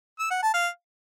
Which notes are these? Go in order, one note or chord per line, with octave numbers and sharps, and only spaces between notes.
E6
F#5
A5
F5